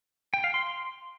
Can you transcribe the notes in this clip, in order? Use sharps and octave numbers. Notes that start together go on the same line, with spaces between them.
G5
F5
C6